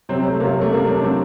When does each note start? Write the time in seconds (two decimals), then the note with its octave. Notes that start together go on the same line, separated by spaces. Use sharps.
0.09 C3 F#3 C4
0.19 C4
0.30 A3
0.40 C3 F#3 A#3
0.51 A3
0.61 A3
0.71 C3 F#3 A#3
0.87 D4
1.02 C3 F#3 C4